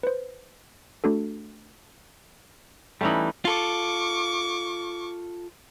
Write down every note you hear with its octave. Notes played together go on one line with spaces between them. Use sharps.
B4 C5
A3 D4 F#4 A4
E3 G3 A3 C#4 D#4
F4 A4 C#6 D6